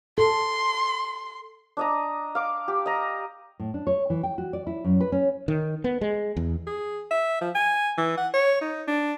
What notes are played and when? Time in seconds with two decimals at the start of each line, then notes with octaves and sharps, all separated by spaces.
0.18 A4 C6
1.77 D4 D#5 A#5
2.35 F5 D6
2.68 G4
2.86 D#5 A#5
3.60 A2
3.74 D4
3.87 C#5
4.10 E3
4.23 G5
4.38 F#4
4.53 D5
4.67 E4
4.84 F#2
5.01 B4
5.12 C#4
5.48 D#3
5.84 B3
6.01 G#3
6.37 E2
6.67 G#4
7.11 E5
7.41 F3
7.55 G#5
7.98 E3
8.17 F#5
8.34 C#5
8.62 D#4
8.88 D4